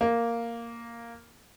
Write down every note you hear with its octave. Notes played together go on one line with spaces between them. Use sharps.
A#3